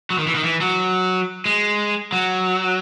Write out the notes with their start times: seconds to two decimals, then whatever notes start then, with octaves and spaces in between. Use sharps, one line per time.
0.10 F#3
0.18 D#3
0.27 E3
0.35 D#3
0.44 E3
0.61 F#3
1.46 G#3
2.12 F#3